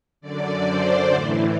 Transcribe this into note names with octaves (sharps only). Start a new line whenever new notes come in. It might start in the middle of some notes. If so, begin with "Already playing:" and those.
F#2 D3 D5
C5
A2 E3